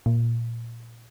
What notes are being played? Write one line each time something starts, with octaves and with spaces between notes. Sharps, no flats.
A#2